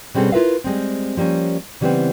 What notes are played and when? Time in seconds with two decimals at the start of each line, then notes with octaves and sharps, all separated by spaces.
0.15 B2 G3 C4 C#4 G#4 A4
0.32 E4 F4 A#4 B4 E5 F5
0.64 G3 G#3 C4
1.17 F3 G3 A#3 C#4
1.81 C#3 E3 G3 A3 B3 C4